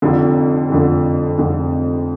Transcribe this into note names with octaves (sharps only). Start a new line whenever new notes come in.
F1 F2 D3
F1 F2 D3
F1 F2 D3